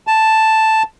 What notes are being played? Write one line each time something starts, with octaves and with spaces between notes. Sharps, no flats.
A5